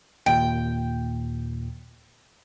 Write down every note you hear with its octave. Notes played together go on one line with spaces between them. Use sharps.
D#2 A#2 G5